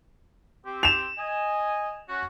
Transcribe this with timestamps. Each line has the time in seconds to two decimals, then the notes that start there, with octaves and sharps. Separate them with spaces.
0.65 C4 G4
0.83 E7 F7
1.18 D#5 G#5
2.09 C#4 F#4